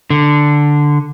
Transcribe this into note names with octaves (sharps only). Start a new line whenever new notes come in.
D3